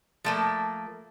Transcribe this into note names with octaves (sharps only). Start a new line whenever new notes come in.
F3 A3 A#3